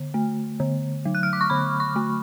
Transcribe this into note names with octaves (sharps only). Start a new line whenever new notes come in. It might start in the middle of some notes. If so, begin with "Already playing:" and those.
Already playing: D3
A3
D3
F#3
F#6
F6
D6
C#6
D3 B5
C#6
A3